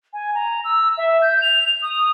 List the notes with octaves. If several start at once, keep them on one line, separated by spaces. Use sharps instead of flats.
G#5
A#5
E6
E5
G6
F7
D#6